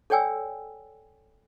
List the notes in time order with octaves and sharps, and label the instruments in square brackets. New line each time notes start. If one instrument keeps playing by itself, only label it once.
[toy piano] A4 C#5 D5 G5 G#5 E6